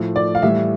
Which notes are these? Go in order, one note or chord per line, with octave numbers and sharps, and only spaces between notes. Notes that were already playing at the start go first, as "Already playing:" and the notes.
Already playing: A2 F3 A3
D5
F5
A2 E3 G3 E5